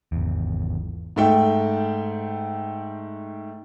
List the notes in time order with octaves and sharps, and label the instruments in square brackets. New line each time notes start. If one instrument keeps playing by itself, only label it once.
[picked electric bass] G#1 E2
[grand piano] G#2 A3 G5